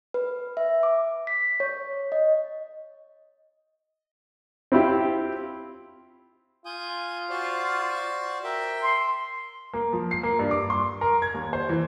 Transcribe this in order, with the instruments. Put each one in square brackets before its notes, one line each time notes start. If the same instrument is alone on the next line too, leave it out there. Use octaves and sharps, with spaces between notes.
[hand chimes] B4
E5
D6
B6
C#5
D#5
[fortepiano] C4 E4 F4 G4
[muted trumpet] F4 [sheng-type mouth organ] G#5 D#6 G6
[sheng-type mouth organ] F#4 C5 D5
A#4 E5 G5
[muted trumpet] C6
[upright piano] A#3
F3
C7
A#3
G2
D6
C6
A#4
G#6
D#2
C5
E3